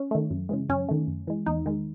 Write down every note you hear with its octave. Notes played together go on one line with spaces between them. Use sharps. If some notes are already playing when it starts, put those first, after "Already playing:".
Already playing: C#4
D#3 A3
F#2
C#3 E3 G#3
F#2 C#4
D#3 A3
F#2
E3 G#3
E2 D#4
D#3 G#3